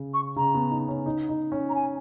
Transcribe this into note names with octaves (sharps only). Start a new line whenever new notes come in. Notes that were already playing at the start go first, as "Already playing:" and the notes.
Already playing: C#3
C#6
C#3 A#5
B3
D#4
C#4
D#4
D#4
C#4
A#5
G#5